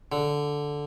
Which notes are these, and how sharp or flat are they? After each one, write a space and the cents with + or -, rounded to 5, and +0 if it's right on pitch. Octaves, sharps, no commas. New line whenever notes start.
D3 -5